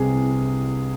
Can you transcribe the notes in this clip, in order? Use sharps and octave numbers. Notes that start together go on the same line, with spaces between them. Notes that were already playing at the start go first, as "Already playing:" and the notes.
Already playing: C2 C3 E3 G#4